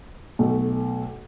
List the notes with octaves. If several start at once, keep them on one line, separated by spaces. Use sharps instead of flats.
B1 B2 A3